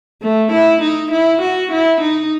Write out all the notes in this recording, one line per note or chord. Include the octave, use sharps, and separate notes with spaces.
A3
E4
D#4
E4
F#4
E4
D#4